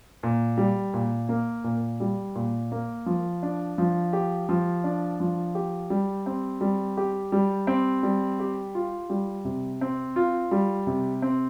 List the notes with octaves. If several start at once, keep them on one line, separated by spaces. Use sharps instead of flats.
A#2
G3
A#2
A#3
A#2
G3
A#2
A#3
F3
D4
F3
G4
F3
D4
F3
G4
G3
C4
G3
G4
G3
C4
G3
G4
F4
G3
C3
C4
F4
G3
C3
C4